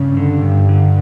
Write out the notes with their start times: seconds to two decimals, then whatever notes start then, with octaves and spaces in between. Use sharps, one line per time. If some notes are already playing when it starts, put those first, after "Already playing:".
Already playing: G2 C#3
0.17 D3
0.42 G2
0.69 D3